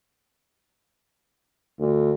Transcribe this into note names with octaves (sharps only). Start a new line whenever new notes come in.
D2